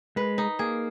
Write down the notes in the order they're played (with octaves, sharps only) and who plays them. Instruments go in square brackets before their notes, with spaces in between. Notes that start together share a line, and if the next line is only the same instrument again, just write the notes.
[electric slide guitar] G#3 [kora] B4
[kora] D#4
[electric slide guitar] A#3 [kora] G#4